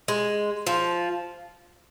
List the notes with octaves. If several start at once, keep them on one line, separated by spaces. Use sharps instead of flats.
G#3
F3